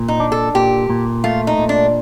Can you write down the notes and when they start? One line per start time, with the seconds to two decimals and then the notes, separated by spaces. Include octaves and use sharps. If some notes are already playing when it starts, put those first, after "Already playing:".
Already playing: A#2
0.08 D#4
0.20 D4
0.32 A4
0.55 A#2 G4
0.90 A#2
1.24 A3 F4
1.47 D#4
1.58 A#2
1.69 D4